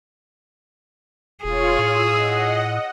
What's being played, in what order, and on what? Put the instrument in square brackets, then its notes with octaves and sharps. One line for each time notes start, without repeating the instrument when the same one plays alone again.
[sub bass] E1 [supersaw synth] F4 C#5 [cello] G#4
[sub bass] A2 [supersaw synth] D#6 E6
[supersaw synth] D#5 F#5